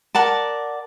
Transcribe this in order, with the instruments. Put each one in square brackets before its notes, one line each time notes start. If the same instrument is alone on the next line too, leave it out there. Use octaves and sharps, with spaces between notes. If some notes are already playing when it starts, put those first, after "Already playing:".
[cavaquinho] A#4 D5 F#5 A5